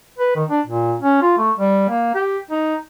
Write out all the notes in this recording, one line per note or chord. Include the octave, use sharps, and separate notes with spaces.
B4
D#3
D4
A#2
C#4
F4
A3
G3
A#3
G4
D#4